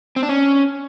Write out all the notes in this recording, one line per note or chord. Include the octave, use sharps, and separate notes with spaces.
C4
D4
C#4